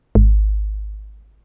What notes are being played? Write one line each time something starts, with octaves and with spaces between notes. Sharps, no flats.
G#1